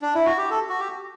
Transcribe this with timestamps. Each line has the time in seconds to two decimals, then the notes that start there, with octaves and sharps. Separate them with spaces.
0.02 D4
0.15 E4
0.26 F#4
0.38 G4
0.51 A4
0.69 F#4
0.79 G4